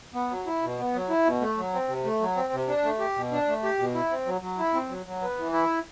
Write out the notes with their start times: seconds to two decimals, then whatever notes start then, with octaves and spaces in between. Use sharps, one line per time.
0.14 B3
0.30 F#3
0.47 E4
0.62 B2
0.78 B3
0.94 F#3
1.09 E4
1.25 B2
1.41 A3
1.57 F#3
1.73 C4
1.88 C3
2.05 A3
2.20 F#3
2.36 C4
2.53 C3
2.68 D4
2.84 A3
3.00 G4
3.16 B2
3.32 D4
3.48 A3
3.63 G4
3.79 B2
3.94 E4
4.10 C4
4.26 F#3
4.41 F#3
4.58 E4
4.74 C4
4.89 F#3
5.06 F#3
5.21 B3
5.38 E3
5.53 E4